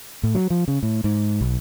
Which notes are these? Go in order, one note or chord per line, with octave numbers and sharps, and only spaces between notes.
A2
F#3
F3
C#3
A2
G#2
B1